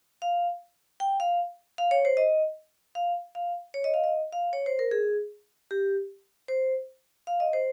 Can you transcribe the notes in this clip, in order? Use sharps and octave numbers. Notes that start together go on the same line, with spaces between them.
F5
G5
F5
F5
C#5
C5
D#5
F5
F5
C#5
D#5
F5
D#5
F5
C#5
C5
A#4
G#4
G4
C5
F5
D#5
C5